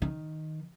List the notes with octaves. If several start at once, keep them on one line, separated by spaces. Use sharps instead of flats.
D#3